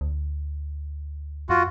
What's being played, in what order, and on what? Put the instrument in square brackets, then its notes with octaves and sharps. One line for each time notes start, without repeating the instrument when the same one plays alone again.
[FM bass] D2
[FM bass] F2 [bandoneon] F4 F#4